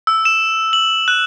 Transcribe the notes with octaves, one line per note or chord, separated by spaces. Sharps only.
E6
E7
F#7
F#6